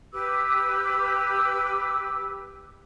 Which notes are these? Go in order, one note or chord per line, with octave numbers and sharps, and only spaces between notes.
G4 B4 D6 E6